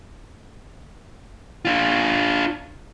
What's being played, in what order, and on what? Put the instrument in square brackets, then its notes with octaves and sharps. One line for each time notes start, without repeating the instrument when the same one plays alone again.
[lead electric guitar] D4 F4